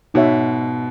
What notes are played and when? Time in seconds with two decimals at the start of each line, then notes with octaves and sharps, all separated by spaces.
0.14 G#2 B2 D#4 F#4 C#5 E5